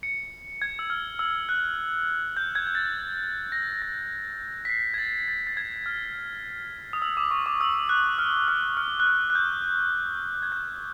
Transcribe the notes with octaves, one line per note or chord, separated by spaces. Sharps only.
C#7
G#6
E6
F6
E6
F#6
G6
G#6
G#6
A6
A#6
A#6
B6
C7
G#6
A6
A6
A6
G#6
F6
D#6
E6
D6
C#6
D6
E6
F#6
F6
F6
F6
F#6
F6
F#6
G6
G#6
G6